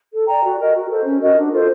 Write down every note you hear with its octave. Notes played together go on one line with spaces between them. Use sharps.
A4
D5 G5 A#5
F#4
A#4 D#5
F#4
A4 C5
C#4
F#4 A#4 D#5
D4
F4 A4 C5